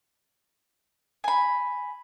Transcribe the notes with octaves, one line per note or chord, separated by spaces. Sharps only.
G#5 B5